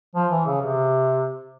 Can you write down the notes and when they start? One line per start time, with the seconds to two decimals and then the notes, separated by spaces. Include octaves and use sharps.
0.15 F3
0.31 E3
0.46 C#3
0.61 C3